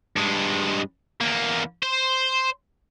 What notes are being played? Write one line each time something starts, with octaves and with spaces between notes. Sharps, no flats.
G2 G#3
E2 A#3
C5